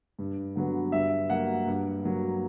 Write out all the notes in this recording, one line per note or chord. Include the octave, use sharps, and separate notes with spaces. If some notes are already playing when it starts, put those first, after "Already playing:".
G2
D3 F#3 B3
G2 E5
F#3 A#3 F#5
G2
F#3 A#3